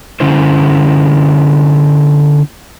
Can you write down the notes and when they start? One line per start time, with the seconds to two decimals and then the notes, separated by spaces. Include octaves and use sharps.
0.20 D3 C#4 E4 C5